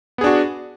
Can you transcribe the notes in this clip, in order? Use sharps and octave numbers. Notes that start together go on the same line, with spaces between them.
B3 D4 F#4 G#4